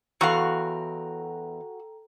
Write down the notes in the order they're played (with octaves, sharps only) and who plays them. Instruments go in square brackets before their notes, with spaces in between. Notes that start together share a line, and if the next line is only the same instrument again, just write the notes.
[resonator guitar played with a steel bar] E2 F5 [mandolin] F#4 [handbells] A4 G5 A#5